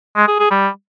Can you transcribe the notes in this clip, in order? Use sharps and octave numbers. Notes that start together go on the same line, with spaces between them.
G#3
G#4
G#4
G3